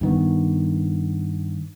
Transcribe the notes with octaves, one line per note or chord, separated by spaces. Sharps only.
G2 D#3 B3